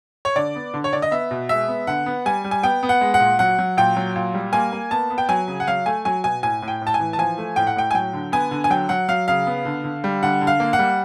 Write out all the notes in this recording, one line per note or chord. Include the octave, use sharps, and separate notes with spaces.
C#5
D3 D5
B3
D3
C#5
D3 D5
D#5
B3 E5
B2
G#3 E5
B3
D3 F#5
B3
G3 G#5
G3
G#5
B3 G5
B3
F#5
G#3
F#5
A#2
F#3 F#5
F#3
A#2 G5
F#3
A#2
G3
A#3 G#5
A#3
B3 A5
B3
G5
F#3 G#5
C#3
F#5
F#3 F5
A3 G#5
F#3 G#5
B2 G#5
A2 G#5
A2
G5
A2
A5
G#5
E3
A5
F3 G#5
A3
A2 G5
F#5
A2 G5
G#5
F#3 G5
D3
B3 G#5
D3
G#5
F#3 G5
F#3 F#5
F#3 F5
C#3 F5
B3
D3
D3
G3
D3 F#5
D3
F5
A#3
F#5
G3